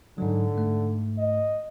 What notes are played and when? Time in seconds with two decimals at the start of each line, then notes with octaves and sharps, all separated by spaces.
0.18 G#2 D3 F#3
0.55 G#2 A3
1.18 D#5